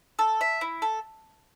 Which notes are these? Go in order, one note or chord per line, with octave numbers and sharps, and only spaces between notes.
A4
E5
E4
A4